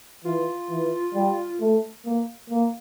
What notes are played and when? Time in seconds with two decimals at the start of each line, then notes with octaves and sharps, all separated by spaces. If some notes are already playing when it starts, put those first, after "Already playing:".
0.25 E3 F4
0.70 E3
1.14 G3
1.60 A3
2.05 A#3
2.50 A#3